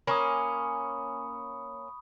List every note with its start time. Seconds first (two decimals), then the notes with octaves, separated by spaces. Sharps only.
0.07 A#3 C#4 G#5 B5 C#6 D#6